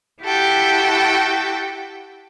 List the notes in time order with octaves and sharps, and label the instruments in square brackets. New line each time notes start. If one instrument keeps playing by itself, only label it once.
[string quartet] E4 F#4 G4 A4 G5